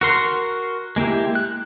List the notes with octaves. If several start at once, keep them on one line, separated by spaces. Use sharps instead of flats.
F#4 A#4 C6
G#3 A#3 E4 G4
F#6